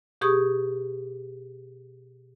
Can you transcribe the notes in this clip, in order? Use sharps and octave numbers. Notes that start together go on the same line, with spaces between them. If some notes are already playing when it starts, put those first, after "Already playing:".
B2 G4 G#4 C#6 D#6